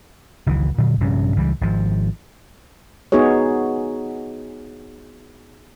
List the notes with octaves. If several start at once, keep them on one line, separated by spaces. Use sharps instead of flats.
F#1 C#2 D#3 E3
A#2 D3 F#3
A#1 G2 C3 C#4
C#2 E3 G3
G#1 F3
B3 D#4 F#4 G#4 C#5